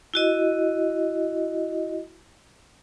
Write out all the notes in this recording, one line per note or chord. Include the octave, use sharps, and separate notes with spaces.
E4 F#4 D#5